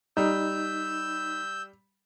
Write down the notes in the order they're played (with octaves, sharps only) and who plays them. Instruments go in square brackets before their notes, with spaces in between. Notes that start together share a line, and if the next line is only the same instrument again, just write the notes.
[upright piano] G3 [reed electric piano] D#4 [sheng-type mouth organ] E6 G6